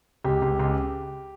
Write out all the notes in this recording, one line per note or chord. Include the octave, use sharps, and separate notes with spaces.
C#2 G4
C#2
C#2